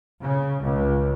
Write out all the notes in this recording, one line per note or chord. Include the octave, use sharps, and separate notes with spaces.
C#3
C#2